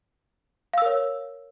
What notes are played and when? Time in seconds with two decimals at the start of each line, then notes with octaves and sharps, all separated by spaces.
0.73 F5
0.78 E6
0.82 A#4
0.86 C#5